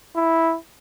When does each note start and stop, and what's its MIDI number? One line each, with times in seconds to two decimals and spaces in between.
0.16 0.55 64